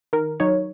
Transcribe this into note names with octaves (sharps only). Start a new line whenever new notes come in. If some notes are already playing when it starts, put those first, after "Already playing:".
D#3 A#4
F#3 D#4 C#5